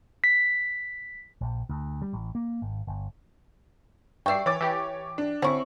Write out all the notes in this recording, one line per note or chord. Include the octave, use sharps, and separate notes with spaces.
B6
A#1
D2
G3
A1
A#3
G#1
G1
G2 D5 E5 G5 C#6 C7
E3 C#5 D6 A6
E3 G4
D4
D3 C4 C#4 E4 C#6